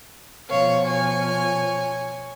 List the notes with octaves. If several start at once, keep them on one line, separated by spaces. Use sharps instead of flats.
B2 F3 C#5 F5
C#5 G#5